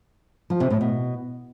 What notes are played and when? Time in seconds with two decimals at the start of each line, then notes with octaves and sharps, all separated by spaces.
0.50 F3
0.60 C3
0.71 A2
0.81 B2